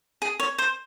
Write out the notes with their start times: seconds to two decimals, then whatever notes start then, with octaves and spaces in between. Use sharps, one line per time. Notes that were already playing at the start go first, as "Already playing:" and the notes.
0.22 G#4
0.40 C#5
0.58 C5